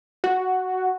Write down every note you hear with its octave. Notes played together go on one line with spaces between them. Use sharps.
F#4